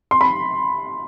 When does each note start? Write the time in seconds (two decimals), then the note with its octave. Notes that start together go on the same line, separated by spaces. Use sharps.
0.11 C6
0.21 B5